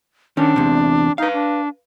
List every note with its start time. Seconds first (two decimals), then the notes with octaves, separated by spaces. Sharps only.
0.37 D#3 C#4 D4
0.56 E2 C3
1.18 D#4 B4 F5
1.33 D4